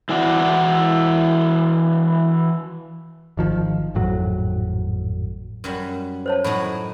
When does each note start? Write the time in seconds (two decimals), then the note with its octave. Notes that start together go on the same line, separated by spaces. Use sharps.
0.09 E3 E4 F#4 D5
3.37 G#1 D#3 F3
3.95 G#1 F2 A2 F#3
5.64 F#2 F#3 G3
6.26 C5 C#5 A5
6.44 A2 F#3 D#4 B5